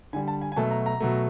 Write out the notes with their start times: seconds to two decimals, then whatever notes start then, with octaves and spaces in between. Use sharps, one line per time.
0.13 D3 G3 G#5
0.28 A5
0.41 G#5
0.52 G#5
0.56 B2 F#3 A3 A5
0.71 A#5
0.86 A#5
1.00 B2 F#3 A3